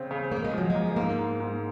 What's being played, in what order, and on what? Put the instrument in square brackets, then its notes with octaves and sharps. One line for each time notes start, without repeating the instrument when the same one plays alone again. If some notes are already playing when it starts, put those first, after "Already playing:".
Already playing: [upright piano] C#3 C4
C#3
[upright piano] C#3 [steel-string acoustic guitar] A#3
[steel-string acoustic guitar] G#3
[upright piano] F3 [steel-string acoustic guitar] F#3
[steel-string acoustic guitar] G#3 [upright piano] A#3
[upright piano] G#2 [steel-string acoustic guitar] A#3
[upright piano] G#2
G#2